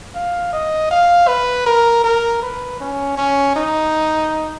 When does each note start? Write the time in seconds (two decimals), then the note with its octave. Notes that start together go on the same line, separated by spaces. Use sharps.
0.15 F5
0.53 D#5
0.91 F5
1.28 B4
1.67 A#4
2.04 A#4
2.43 B4
2.81 C#4
3.17 C#4
3.56 D#4